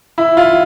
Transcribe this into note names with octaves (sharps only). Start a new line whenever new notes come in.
E4
F4